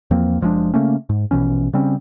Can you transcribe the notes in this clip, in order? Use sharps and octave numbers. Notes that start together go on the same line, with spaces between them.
E2 F3 A#3 C4
F#1 F3 G#3 D4
C#3 A3 A#3 C#4
G#2
A#1 B2 E3 C#4
C#3 G3 C4 C#4